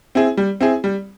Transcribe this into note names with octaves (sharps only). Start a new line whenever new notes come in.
C4 E4 G#4
G3
C4 E4 G#4
G3